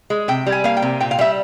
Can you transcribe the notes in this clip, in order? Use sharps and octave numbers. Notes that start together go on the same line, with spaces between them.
G#3
C3 G5
G3
G#5
A#3 F5
G5
C3
A#2 G5
F5
G3 E5